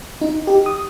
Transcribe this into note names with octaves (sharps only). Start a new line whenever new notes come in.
D#4
G4
D#6